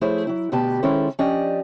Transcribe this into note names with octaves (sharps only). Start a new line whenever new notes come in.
F3 A3 E4 G#4 C5 C#5
F#3 E4
D2 B2 G4 B4 A5
D#3 G#3 C#4 E4 A4 C5
F3 C#4 D4 G4 D5 D#5